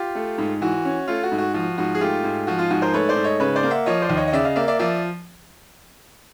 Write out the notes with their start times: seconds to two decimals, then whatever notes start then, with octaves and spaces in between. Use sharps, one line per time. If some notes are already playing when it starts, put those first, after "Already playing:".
Already playing: F4 G4
0.15 A3
0.38 G#2
0.61 E3 F#4
0.85 C#4
1.08 A3 F4
1.23 F#4
1.32 G#2
1.38 F#4
1.54 F3 F#4
1.78 G#2 F#4
1.95 G#4
2.01 A3 F4 G4
2.24 G#2
2.47 F3 F#4
2.59 F4
2.70 G#2 F#4
2.82 A#4 C5
2.94 A3 B4 C#5
3.09 C5 D5
3.16 G#2
3.24 C#5 D#5
3.40 C#3 B4 C#5
3.56 C5 D5
3.63 A#3
3.71 E5 F#5
3.86 F3 C#5 D#5
4.02 C5 D5
4.09 D#2
4.17 C#5 D#5
4.27 D#5
4.33 C#3 D5 E5
4.45 D#5 F5
4.56 A#3 D5 E5
4.68 D5 E5
4.79 F3 D5 E5